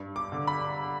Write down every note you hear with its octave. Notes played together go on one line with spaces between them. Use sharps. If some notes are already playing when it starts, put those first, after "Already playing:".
Already playing: G2
D6
D3
B5